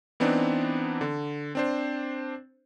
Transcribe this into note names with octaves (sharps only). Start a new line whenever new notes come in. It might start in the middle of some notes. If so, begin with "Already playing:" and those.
E3 B3 C4 D4 D#4
D3
C4 D4 C5